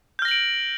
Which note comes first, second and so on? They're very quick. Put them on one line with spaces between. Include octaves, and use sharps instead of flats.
G6 F6 A#6 F#7 D7